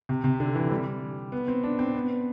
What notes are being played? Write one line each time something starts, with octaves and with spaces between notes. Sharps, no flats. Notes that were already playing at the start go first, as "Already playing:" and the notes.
C3
C3
D3
E3
G3
B3
C4
D4
C4
B3